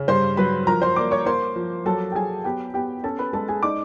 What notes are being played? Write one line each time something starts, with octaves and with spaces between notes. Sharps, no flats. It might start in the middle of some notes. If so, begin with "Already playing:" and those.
Already playing: C#3
G2 C5 C6
F#3 B4 B5
F3 A#4 A#5
C5 C6
A#3 D5 D6
C#5 C#6
A#3 C5 C6
F3
F#3 A4 A5
G5
F#3 G#4 G#5
B3 G4 G5
B3 G4 G5
C#4 A4 A5
B4 B5
G#3 A4 A5
G#4 G#5
D#4 D5 D6